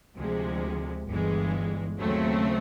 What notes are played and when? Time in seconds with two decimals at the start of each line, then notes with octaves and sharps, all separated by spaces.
0.16 D2 C3 F3 G#3
1.07 G1 G2 E3 G#3
1.99 D#2 C#3 F#3 A3 C4